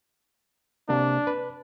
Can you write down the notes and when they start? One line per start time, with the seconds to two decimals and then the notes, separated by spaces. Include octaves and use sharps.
0.89 C3 A#3 D4
1.27 B4